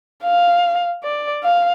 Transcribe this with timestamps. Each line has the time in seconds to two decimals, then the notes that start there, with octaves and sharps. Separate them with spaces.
0.24 F5
1.04 D5
1.44 F5